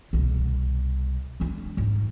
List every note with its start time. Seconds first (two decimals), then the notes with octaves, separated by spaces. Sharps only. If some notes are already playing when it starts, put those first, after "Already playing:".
0.13 C2 B2
1.40 G#3 D4
1.77 G#2 D#4